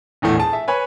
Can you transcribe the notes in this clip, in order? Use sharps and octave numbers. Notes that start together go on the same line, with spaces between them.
A#1 E2 A2 A3
G#4 A5
E5
B4 C#5 G#5 B5